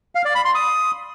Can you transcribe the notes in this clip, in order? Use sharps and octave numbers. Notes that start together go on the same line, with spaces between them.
F5
D5
B5
C6
D#6